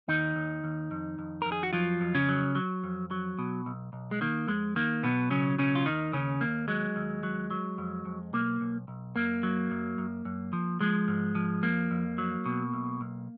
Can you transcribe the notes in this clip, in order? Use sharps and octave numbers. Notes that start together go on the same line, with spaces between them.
D#2 D#3 D#4
D#2
D#2
F2
F2
F2 A#4
G#4
F#4
F3 F#3 F4
F2
C#3 C#4
F#3
F#3
F2
F#3
B2
B1
B1
G#3
D#3 A#3
F2 G#3
D#3 A#3
B1 B2 B3
C#3 F#3 C#4
B1 C#3 C#4
F4
D#2 D#3 D#4
D#2 C#3 C#4
D#2 A#3
F#3 G#3
D#2
F#3
F#3
F2
F2
B1 A#3
B1
B1
F#2 A#3
F#3
F#2
F#2
F#2
F3
F3 G#3
G#2
F3
F2 A#3
F2
F#3
B2
B1
B1